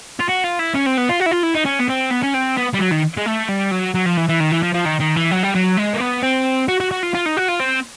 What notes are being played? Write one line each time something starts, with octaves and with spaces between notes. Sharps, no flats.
F4
F#4
F4
E4
C#4
C4
B3
F4
F#4
E4
F4
E4
D#4
C#4
B3
C4
B3
C#4
C4
B3
G3
F#3
D#3
G#3
A3
G3
F#3
F#3
F3
E3
E3
D#3
E3
F3
F3
D#3
D#3
E3
F#3
G3
F#3
G#3
A#3
B3
C4
F#4
F#4
F#4
F4
F4
D#4
F#4
F4
C4